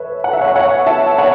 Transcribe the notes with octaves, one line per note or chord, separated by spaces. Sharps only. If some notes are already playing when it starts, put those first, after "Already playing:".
Already playing: A4 B4 C#5 E5
F#5
E5
C#5 F#5
C#5 F#5
E5 A5
C#5 F#5